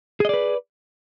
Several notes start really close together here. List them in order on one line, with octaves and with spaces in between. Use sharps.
G#4 D#5 D5 B4